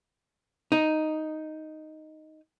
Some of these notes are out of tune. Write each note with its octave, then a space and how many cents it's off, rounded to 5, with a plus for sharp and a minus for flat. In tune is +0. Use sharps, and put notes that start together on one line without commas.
D#4 +0